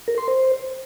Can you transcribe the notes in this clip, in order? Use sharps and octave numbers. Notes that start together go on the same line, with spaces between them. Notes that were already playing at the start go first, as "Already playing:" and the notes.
A#4
C6
C5